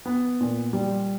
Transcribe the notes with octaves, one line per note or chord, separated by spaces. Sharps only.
B3
A#2
G3